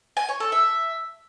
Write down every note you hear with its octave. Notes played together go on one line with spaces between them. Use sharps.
G#5
C#5
A4
E5